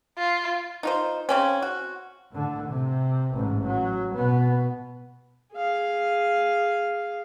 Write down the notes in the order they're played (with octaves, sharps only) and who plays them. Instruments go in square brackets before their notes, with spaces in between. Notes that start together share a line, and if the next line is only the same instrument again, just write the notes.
[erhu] F4
[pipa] D#4 F4 C5
C#3 C4 C#4
F#4
[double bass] A2 D3
C3
A1 G#2
F#3
B2 B3
[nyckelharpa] G#4 F5